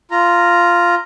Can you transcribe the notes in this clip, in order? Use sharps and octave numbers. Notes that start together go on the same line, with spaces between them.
F4 A#5